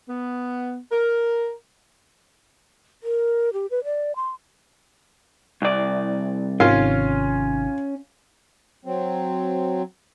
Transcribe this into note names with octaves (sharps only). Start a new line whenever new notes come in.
B3
A#4
A#4
G4
B4
D5
C6
C2 D5
G#1 C3 D#3 C#4 F4 F5
F#3 C4